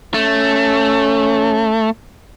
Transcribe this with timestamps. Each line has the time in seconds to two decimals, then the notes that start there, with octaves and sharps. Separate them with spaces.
0.14 A3 C#4